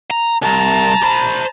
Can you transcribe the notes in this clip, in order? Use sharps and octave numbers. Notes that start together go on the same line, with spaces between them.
A#5
C2 A5 A#5
C5 B5